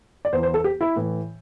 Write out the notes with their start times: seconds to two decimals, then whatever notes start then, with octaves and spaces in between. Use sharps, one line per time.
0.25 D5
0.33 E2 E3 C5
0.43 C5
0.54 A4
0.64 G4
0.81 E4
0.96 A2 E3